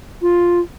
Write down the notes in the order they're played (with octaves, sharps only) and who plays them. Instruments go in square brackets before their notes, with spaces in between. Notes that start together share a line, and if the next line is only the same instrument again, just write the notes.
[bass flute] F4